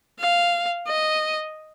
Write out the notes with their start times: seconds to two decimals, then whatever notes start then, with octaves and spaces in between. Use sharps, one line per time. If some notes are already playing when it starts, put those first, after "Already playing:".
0.19 F5
0.87 D#5